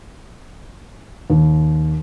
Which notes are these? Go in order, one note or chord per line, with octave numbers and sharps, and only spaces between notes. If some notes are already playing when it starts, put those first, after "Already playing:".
D#2